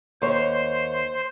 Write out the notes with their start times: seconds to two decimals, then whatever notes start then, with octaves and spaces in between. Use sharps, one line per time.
0.22 D#2 C5 C#5